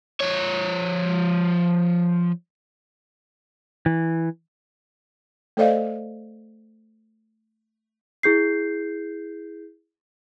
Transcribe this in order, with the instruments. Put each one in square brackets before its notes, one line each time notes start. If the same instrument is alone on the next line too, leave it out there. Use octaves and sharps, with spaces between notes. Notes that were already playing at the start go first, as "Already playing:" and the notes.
[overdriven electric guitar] F3 C#5
[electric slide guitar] E3
[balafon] A3 A4 C5 D5 D#5 F5
[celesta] E4 G#4 G6 C7